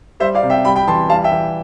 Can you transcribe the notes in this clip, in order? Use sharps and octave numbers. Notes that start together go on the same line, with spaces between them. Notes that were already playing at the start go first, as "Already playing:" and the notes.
G3 C5 E5
D5 F5
C3
E5 G5
G3 G5 B5
G5 B5
E3 A5 C6
G3 F5 A5
E5 G5
E3